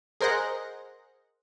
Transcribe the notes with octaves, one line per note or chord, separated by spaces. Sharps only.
G#4 A#4 C5 D#5 F#5 A#5